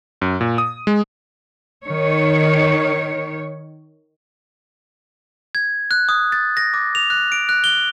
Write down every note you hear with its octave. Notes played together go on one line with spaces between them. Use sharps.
F#2
A#2
D#6
G#3
D#3 C#5
G#6
F#6
D#6
A6
A#6
D6
F7
F#6
D7
F#6
G7